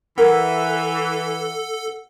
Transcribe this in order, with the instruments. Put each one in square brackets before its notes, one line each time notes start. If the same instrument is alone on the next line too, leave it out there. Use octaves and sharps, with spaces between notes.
[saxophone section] E3 [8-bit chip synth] A4 [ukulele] A#4 [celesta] F#5